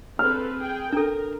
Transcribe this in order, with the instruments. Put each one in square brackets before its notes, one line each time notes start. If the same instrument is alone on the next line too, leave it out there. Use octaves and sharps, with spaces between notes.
[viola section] C4 A4 B4 [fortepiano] F6
[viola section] G#4 G5
[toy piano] D4 A4 [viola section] A#4